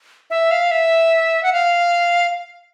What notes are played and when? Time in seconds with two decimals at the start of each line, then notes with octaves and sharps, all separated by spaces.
0.30 E5
0.51 F5
0.71 E5
1.43 F#5
1.53 F5